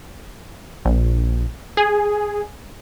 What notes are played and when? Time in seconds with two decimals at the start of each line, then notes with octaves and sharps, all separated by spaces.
0.85 A#1
1.77 G#4